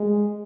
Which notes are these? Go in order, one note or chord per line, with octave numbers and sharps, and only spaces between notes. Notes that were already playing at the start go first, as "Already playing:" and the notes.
Already playing: G#3